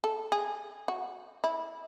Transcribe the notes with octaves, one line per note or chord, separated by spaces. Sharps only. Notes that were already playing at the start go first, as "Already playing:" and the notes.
A4
G#4
F#4
E4